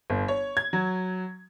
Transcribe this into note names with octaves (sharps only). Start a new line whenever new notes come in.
G1
C#5
G#6
F#3